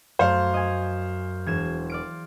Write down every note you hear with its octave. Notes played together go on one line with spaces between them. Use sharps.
F#2 A3 C5 F5
D#5 G#5
E1 G#6 E7
D5 F6 D7